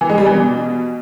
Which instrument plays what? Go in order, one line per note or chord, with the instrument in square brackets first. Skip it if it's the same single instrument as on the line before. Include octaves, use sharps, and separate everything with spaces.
[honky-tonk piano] E3
G#3
G3
E3
B2